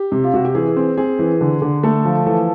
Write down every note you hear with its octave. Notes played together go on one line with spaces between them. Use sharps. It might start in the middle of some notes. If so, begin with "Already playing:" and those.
Already playing: G4
C3
F4
C3 F#4
G4
E3 G#4
C4
C4 G#4
E3
D3
D3
A3 A4
F3
E3 A4